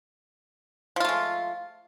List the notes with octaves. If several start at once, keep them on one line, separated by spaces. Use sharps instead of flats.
F3 G#3 A3 F4